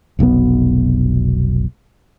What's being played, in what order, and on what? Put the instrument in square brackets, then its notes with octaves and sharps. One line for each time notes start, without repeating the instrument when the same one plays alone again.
[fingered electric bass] F1 B1 B2 B3